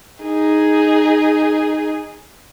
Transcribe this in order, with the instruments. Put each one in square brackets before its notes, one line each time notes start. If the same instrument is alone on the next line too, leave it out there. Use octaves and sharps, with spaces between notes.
[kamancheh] D#4 G#4